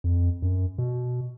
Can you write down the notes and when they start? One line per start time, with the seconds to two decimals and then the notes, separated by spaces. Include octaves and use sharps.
0.04 F2
0.42 F#2
0.78 B2